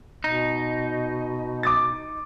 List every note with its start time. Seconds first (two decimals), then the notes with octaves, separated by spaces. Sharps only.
0.24 B2 D#4
1.63 D6 D#6 A6